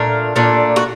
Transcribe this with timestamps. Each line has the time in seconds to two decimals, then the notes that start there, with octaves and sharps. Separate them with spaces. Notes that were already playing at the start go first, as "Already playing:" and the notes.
Already playing: A#2 A3 D4 A#4
0.36 A#2 A3 D4
0.76 F#4